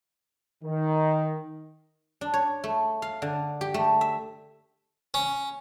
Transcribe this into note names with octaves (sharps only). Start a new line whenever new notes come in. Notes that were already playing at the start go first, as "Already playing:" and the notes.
D#3
D4
C#5
A3
F5
D3
G4
A3
E5
C#4